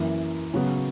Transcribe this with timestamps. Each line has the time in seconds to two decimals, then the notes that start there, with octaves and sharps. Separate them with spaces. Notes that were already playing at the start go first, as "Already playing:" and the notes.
Already playing: F#2 E3 A#3 E4
0.54 C#3 F#3 B3 F#4